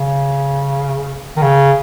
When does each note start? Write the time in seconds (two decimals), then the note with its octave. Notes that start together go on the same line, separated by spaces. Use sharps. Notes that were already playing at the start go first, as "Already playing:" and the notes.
Already playing: C#3
1.37 D#3
1.42 C#3